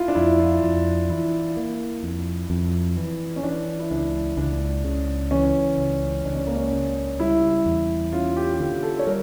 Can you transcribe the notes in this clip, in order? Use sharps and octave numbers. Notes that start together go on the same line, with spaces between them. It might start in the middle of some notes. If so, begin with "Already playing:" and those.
Already playing: E4 F4
D4
F2 E4
F4
F2
E3 E4
A#3
F2
F2
E3
C#4
E3 D4
E4
C#2 D4
C#2 D4
C#3
E3 C#4
C#2
C#2 D4
C#4
A#3
C#4
C#3
G3 E4
E2
C#4 F4
G4
G4
D3 F4
A4
C#5
G3 A#4